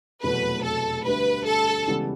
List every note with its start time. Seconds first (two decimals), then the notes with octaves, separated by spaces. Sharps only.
0.23 F1 E2 B2 F#3 A3 B4
0.64 A4
1.05 D2 D3 G3 B4
1.46 A4
1.87 C#2 C#3 E3 G3 B3